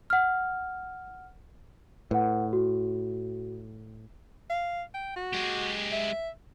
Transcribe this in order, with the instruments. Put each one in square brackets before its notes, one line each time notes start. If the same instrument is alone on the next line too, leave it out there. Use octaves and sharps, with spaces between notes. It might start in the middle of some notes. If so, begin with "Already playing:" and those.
[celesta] F#5 F6
[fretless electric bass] A2 [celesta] B4 F#5
[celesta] F#4
[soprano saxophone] F5
G5
F#4
[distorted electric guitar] G#3 G4
[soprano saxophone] E5